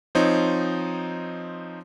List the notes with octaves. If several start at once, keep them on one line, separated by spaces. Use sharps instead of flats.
F3 C4 D#4 C#5